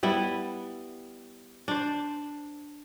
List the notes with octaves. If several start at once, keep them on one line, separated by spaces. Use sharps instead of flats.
G3 B3 E4
D4 C5